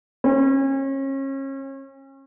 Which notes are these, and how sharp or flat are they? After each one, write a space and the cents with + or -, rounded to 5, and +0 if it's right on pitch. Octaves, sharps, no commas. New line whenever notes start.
C#4 -35